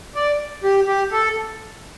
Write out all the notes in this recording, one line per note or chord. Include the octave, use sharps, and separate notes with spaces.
D5
G4
G4
A4